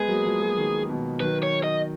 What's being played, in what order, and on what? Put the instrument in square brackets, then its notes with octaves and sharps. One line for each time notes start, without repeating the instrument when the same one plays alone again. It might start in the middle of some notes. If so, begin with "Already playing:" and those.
Already playing: [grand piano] G#3 B3 [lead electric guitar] G#4
[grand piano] F#3 A#3
F3 G#3
F#3 A#3
D#3 F#3
B2 D#3
[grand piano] D#3 F#3 [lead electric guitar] B4
[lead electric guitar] C#5
D#5